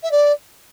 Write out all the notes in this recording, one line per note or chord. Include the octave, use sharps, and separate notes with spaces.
E5
D5